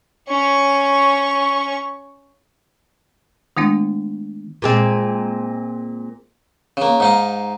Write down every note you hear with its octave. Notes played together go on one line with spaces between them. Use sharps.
C#4 C#6
D#3 G#3 A3 B3 D4 E4
A#2 G#3 C4
C#3 A#3
G#2 D#4 F5